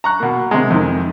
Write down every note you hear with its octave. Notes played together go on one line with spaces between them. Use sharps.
A#5 C#6 F#6
B2 A#3
C3 G#3
F2 D#3